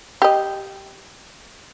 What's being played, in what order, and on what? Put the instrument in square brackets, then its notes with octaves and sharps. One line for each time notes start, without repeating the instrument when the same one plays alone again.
[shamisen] G4 D#5